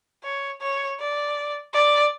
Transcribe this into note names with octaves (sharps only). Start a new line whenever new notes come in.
C#5
C#5
D5
D5